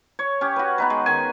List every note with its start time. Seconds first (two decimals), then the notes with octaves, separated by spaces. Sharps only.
0.19 C#5
0.41 C#4 G4
0.56 F#4 B4
0.78 B3 D#4 B4
0.90 G#3
1.06 D#3 G#5